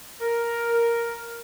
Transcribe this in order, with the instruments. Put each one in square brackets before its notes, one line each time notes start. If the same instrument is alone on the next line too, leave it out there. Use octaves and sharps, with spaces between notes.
[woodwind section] A#4